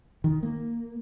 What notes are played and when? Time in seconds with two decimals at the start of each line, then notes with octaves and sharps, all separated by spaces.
0.24 D#3
0.43 A#3